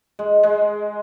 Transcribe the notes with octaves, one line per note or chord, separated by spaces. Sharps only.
G#3
G#3